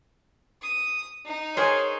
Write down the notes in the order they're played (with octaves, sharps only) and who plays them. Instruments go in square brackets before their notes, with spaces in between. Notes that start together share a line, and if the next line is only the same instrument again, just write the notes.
[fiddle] D#6
D#4
[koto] G#4 A#4 C5 [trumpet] C#5